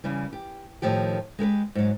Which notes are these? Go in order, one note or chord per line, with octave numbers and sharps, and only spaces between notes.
C#3 E3 G3
G4
A2 D#3 F3 G4
G#3 G4 A#4 B4
G#2 F#3